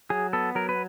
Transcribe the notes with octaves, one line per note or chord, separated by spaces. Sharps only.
F#3 G#4
B3 A4
F#3 A#4
B4